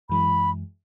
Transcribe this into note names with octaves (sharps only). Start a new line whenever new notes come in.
F#2 E3 G#3 B5